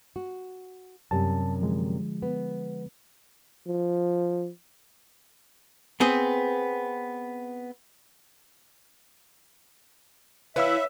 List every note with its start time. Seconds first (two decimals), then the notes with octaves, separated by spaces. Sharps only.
0.16 F#4
1.11 F#2 C3 G3 A5
1.60 D3 F3 G#3
2.22 B3
3.67 F3
6.00 B3 C4 G#4
10.56 E3 E4 B4 C#5 E5 F5 E6